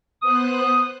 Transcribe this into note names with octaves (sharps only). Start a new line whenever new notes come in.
B3 C5 D#6 F#6